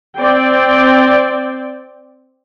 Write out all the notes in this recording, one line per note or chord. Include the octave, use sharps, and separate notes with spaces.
C4 D5 G5